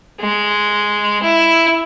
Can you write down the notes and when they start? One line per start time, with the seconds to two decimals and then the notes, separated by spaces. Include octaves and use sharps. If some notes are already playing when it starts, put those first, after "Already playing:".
0.21 G#3
1.23 E4